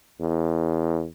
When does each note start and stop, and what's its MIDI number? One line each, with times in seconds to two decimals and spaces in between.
0.21 1.05 40